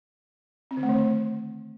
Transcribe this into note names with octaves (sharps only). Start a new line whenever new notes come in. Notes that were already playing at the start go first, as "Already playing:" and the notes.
C4
D3
A3
D#3